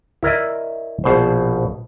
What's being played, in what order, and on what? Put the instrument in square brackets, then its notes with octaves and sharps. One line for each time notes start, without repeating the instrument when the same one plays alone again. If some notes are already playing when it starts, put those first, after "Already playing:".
[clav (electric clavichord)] E4 A#4 D5 D#5
A#1 B2 C5